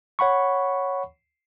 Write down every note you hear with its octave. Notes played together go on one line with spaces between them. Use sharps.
C#5 F#5 B5 C#6